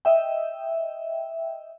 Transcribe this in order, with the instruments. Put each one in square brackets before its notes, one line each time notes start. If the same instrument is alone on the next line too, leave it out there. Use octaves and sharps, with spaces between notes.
[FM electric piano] D#5 E5 G5